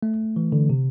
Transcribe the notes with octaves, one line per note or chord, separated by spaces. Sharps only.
A3
E3
D3
C3